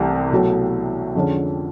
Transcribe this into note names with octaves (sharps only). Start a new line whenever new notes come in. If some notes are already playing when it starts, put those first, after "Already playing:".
Already playing: C2 C3 E3 A3
B2 F#3 A3
F2 D3 F3 G#3 C#4